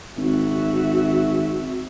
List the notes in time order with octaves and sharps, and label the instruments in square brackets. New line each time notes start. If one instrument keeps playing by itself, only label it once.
[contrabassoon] G#1 [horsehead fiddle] F#4 E5